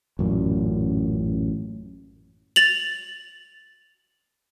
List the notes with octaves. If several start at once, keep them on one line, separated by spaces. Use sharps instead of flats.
A1 F#2 A#2
A6 F7 F#7